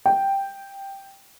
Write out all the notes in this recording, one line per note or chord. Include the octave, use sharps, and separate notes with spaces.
G5